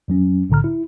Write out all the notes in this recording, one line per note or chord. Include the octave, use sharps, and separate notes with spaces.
F2 F#3 C#4
B1 A2 D3 A#5 F6
E4